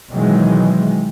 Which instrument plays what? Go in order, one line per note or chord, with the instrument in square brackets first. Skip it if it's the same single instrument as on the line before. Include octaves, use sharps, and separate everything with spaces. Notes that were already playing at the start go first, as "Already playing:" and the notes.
[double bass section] B2 D#3 E3 F#3 G#3